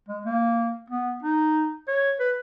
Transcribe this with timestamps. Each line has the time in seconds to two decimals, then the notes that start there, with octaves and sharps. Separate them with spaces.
0.09 G#3
0.25 A#3
0.90 B3
1.23 D#4
1.88 C#5
2.20 B4